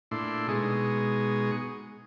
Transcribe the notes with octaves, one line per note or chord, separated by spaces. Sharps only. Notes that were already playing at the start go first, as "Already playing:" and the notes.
A#2 A3 D4 E4 C6
B2 G#3 D#4 G#4 C#6